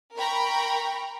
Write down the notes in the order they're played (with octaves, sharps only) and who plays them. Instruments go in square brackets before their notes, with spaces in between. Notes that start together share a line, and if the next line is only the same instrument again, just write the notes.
[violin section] A#4 G5 A#5 B5 C#6